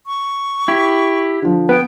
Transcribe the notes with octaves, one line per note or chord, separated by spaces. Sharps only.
C#6
E4 G4
D3 F3
B3 G5